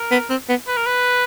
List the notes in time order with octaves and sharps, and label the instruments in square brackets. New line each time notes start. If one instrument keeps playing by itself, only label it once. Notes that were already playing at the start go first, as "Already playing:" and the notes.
Already playing: [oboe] A#4
[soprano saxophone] B3
C4
B3
[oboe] B4
A#4
B4